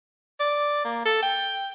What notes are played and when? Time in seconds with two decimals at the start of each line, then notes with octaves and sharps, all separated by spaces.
0.40 D5
0.84 A#3
1.05 A4
1.22 G5